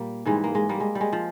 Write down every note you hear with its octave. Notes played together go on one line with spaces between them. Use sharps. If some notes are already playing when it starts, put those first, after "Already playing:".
Already playing: A#2 G3 A#3
G#2 E3 G3 G#3
A#3
G#3
G3 A#3
G#3
G3
G#3
F3